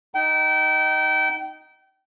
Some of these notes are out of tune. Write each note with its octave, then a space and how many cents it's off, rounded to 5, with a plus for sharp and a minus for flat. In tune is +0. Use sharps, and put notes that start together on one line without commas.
D#4 +0 G5 -30